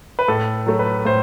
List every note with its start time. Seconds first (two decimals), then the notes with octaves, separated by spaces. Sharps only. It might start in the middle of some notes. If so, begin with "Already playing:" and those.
0.19 B4
0.28 A2 A4
0.67 F#3 A3
0.79 B4
1.05 A2 C5